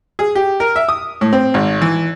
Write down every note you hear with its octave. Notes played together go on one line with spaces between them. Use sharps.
G#4
G4
A#4
E5
D#6
A2
C4
G#1
E3